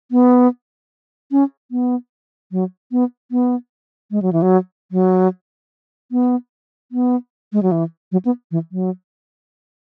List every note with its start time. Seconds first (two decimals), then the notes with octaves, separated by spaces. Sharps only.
0.12 B3
1.32 C#4
1.71 B3
2.52 F#3
2.92 B3
3.31 B3
4.11 G#3
4.22 F#3
4.33 E3
4.42 F#3
4.92 F#3
6.12 B3
6.92 B3
7.53 G#3
7.63 F#3
7.72 E3
8.12 F#3
8.25 B3
8.51 E3
8.72 F#3